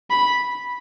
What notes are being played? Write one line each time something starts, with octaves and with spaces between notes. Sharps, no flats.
B5